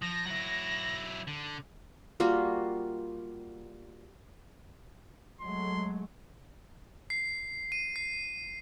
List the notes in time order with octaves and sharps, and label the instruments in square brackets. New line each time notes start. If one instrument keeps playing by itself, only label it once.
[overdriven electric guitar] F3 [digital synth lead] A#6
[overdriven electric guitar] F#3 E4
D3
[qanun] G3 A#3 F4 F#4
[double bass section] F#3 G#3 A3 [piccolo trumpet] C6
[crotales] C7
D#7
C7